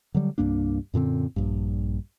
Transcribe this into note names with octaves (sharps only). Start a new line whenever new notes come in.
D3 F#3 G3
C2 G2 A#3 D4
F#2 A#2 D3 C4
A#1 G2